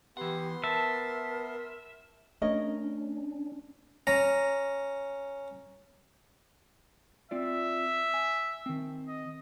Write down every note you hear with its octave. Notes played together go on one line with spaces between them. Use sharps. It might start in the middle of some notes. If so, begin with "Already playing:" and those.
E3 B3 G4 F#5 C6
A#4 E5 A5
A3 C#4 D4 A#4 C#5 D#5
C#4 A#5
C4 F4 D5 E5
G#5
D#3 C4
D#5